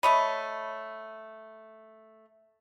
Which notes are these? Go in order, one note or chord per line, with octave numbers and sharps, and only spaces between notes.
A3 C#5 D#5 B5